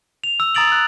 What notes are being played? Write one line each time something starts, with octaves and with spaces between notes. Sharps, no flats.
F7
E6
A#5 D#6 A6 D7 F#7
E6 F#6